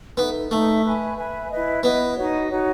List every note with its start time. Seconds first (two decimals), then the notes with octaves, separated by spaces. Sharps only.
0.17 B3 D#4 A4 E5
0.51 A3 D#4 A4 E5
0.84 B4 E5 G#5 B5
1.17 B4 E5 G#5 B5
1.51 E4 B4 D#5
1.83 B3 E4 B4 D#5
2.16 D#4 F#4 C#5
2.49 D#4 F#4 C#5